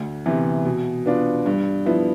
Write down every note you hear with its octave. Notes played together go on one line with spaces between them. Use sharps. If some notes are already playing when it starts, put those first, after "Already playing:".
Already playing: D2
C3 E3 B3
B2
B3 D4 F4
G2
F3 B3 E4